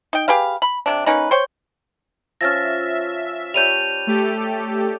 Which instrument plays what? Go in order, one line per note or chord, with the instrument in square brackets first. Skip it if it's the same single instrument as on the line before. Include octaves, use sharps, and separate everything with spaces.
[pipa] D#4 G5
G4 G#4 B4 F5
B5
C3 D4
A#3 C#4 D#4 B4
C5 C#5 G5
[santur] F3 C#4 [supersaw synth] E5 [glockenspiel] F6 A6 A#6
[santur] G3 C#5 A5 [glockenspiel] G6 D#7 F7
[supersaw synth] A3 G4 A4